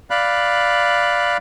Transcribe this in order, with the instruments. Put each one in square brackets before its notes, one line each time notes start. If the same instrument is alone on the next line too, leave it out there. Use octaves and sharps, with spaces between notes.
[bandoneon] D5 F5 B5 F#6